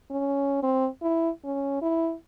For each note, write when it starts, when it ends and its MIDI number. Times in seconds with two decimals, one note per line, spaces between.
0.10 0.60 61
0.63 0.88 60
1.02 1.30 64
1.45 1.81 61
1.82 2.14 64